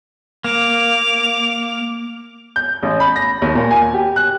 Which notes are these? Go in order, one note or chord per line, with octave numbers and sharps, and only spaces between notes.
A#3 D6 F7
G6
A1
B5
A#6
D#2
A#2
G#5
G4
F#6